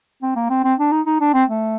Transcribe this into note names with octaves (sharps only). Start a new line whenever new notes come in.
C4
A#3
C4
C4
D4
D#4
D#4
D4
C4
A3